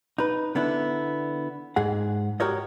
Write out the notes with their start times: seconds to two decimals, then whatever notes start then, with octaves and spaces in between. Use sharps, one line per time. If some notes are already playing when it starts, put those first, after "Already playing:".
0.18 D#4 B4
0.55 D3 B3 D4 E4
1.76 G#2 G#4 F#5
2.40 F#4 G4 A#4 C#5 D#5